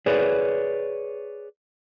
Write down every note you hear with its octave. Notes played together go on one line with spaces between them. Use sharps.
G#4 B4 C#5 D5